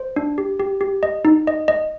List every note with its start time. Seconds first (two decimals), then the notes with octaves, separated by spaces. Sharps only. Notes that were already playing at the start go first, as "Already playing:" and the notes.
Already playing: C5
0.16 D4
0.38 G4
0.60 G4
0.81 G4
1.03 D#5
1.25 D#4
1.47 D#5
1.68 D#5